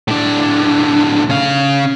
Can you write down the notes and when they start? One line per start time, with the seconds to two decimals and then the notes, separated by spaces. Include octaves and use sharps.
0.08 A2 D4
1.29 C#3 F5